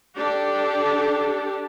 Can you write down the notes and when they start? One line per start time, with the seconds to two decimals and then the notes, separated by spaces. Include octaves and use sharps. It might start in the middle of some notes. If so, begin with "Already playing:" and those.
0.16 D4 G4 A4